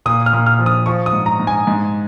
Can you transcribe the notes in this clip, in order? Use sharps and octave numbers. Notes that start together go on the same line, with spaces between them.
A#2 D#6
F6
A#2
F6
F3
D#6
F3 C#6
D#6
G#2
A#5
G#2
G#5
G#2